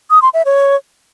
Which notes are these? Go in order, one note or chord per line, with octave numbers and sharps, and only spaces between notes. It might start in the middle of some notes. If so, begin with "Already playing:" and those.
D#6
C6
E5
C#5